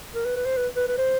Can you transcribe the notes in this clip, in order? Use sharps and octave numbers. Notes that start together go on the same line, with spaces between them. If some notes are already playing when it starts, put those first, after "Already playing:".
A#4
B4
B4
C5
B4
B4
B4
C5